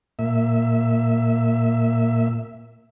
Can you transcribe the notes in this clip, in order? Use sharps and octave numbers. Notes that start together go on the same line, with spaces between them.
A#2 E5